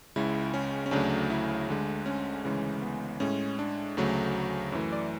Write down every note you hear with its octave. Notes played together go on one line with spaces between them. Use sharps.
C#2 C#3 G#3 E4
C#4
C#4
D2 C#3 F#3 A3 D4
E4
D2 D3 G#3
C#4
D2 C#3 E3 G#3 C#4
B3
A2 G#3 C#4
D4
D2 C#3 F#3 A3
F#2 E3 A3
D5